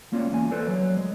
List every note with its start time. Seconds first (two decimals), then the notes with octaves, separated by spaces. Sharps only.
0.12 G#3 A#3 C#4 F4 D5
0.32 E2 G#5
0.52 A4 B4 C5 D5
0.68 F#3 C#5
0.97 G#3